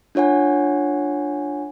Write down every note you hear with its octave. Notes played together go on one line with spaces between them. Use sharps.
D4 F4 C#5 F#5 G#5